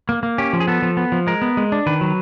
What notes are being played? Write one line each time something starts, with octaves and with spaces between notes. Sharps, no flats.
A#3
A#3
C#4 G4
F3
G#4
B3 A4
F3
B3
F3
G#3 A#4
B3
G#3
D4
D#3 B4
F#3